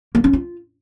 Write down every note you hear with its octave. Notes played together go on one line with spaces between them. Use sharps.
A#3
C#4
F4